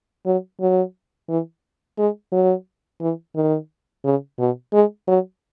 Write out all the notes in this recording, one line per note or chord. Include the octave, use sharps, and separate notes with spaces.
F#3
F#3
E3
G#3
F#3
E3
D#3
C#3
B2
G#3
F#3